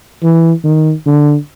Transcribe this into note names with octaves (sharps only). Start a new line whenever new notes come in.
E3
D#3
D3